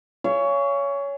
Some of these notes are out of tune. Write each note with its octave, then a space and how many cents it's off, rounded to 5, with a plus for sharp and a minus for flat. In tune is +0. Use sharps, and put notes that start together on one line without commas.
C#5 +20 F5 -35 G#5 +0